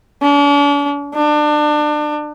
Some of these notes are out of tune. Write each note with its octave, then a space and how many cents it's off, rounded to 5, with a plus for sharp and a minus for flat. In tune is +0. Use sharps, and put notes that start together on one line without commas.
D4 -45
D4 +30